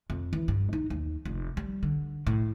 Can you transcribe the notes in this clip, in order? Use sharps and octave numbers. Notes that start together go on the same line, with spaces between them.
F2
E3
G2
D#4
D#2
F1
G3
D3
A2